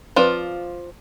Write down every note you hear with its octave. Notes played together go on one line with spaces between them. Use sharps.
F3 C4 F4 B4 D5